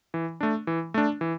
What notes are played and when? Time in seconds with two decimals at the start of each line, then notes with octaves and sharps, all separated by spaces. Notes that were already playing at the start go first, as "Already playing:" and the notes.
0.14 E3
0.41 A3 D4
0.67 E3
0.94 A3 D4
1.21 E3